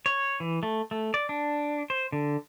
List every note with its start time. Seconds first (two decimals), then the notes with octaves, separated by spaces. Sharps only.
0.06 C#5
0.40 E3
0.63 A3
0.91 A3
1.14 D5
1.29 D4
1.90 C5
2.12 D3